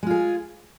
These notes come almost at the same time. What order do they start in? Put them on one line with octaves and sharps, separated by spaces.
G#3 F4 G#4